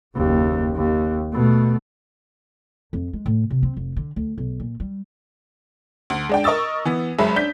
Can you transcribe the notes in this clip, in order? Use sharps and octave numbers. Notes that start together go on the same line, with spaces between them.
F#1 D#2
D#2
B2 A3
F2
G#3
A2
C3
C4
F1
D3
D2
B1
A#2
G3
D2
G#3 D4 G5
A#4 D#5 C#6 D#6 E6 A6
E3 B3
F#1 F#2 G#3 E5 B5
D4 G6 B6